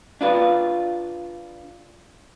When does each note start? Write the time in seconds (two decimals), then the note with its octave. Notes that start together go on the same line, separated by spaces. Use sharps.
0.21 D4 F4 B4